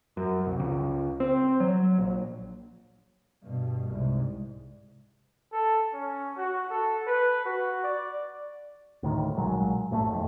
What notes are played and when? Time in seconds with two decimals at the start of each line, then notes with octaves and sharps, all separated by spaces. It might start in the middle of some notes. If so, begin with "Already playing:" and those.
0.17 F#2
0.46 C2
0.59 C#2
1.20 C4
1.60 F#3
1.98 A#1
3.43 G2 B2
3.87 C2 G#2
5.52 A4
5.93 C#4
6.37 F#4
6.70 A4
7.07 B4
7.45 F#4
7.83 D5
9.03 D2 A2 D#3
9.37 B1 A#2 F#3 G#3
9.91 A#1 A2 D3 A3
10.10 G#1 F2